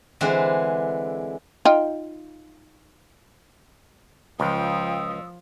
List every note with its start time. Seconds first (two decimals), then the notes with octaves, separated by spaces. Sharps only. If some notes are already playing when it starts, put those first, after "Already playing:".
0.21 D3 E3 G#3 C4
1.65 D#4 F4 G5
4.40 C#2 F3 G5 D#6 E6